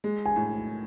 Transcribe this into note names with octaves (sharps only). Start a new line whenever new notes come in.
G#3
G#5
A2